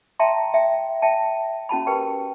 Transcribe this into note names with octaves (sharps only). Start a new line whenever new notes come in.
E5 G5 A5 A#5 C6
E5 G5
E5 G5 A5
C#4 F#4 A5 B5
G4 A#4 B4 G5